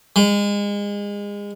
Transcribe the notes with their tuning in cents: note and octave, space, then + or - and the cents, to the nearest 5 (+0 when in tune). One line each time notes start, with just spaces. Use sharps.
G#3 -30